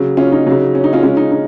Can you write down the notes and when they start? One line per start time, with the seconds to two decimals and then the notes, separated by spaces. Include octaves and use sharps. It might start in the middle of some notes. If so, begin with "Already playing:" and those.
Already playing: C#3 F#3
0.17 C#4 F4
0.32 D#4
0.47 C#3 F#3
0.75 C#4
0.84 D#4
0.93 C#4 F4
1.03 C#3 G#3 C#4 F4
1.17 D#4
1.32 D#4